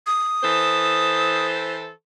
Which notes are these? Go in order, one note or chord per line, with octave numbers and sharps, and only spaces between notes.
D#6
E3 A4 C5